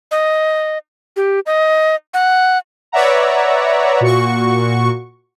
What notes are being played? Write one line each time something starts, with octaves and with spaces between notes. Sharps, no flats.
D#5
G4
D#5
F#5
B4 C#5 D5 E5 F#5 A#5
A#2 F#4 C#6